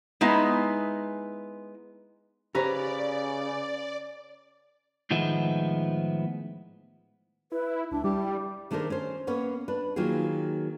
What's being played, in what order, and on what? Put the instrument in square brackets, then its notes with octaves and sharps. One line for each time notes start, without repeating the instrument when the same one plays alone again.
[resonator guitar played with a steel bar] G#3 B3 D#4 E4
[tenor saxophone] C#3 [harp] C#4 B4 A#5 [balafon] G4 C5 [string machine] D5
[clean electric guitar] A2 D#3 F3 G#3 B3 E4
[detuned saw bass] E4 [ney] B4
[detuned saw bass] C#2 [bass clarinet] D4 [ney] E4
[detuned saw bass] G3 [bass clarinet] G4
[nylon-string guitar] D#3 A3 D4 G#4 A#4 C5
C#4 C5
A#3 B3 C#4 C#5
D4 B4
D#3 F#3 A#3 F4 G#4